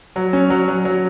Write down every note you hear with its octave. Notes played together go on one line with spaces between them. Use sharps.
F#3
C#4
F#3
F#3
F#3